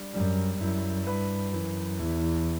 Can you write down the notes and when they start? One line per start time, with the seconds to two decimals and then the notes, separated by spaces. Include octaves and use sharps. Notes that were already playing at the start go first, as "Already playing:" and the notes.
Already playing: G3 D4
0.14 F#2 G3
0.61 F#2 E4
1.07 G2 B4
1.53 F#2 E3
2.00 E2 E4